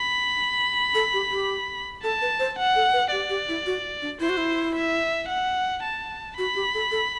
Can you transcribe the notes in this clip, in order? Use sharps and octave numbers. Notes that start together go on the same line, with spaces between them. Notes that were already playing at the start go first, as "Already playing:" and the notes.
Already playing: B5
A4
G4
G4
A4 A5
B4
C5
F#5
A4
B4
G4 D5
G4
E4
F#4
D4
E4 C5
F#4
E4
E5
F#5
A5
F#4 B5
G4
A4
A4